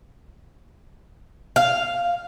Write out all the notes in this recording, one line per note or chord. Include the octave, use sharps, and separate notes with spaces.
F5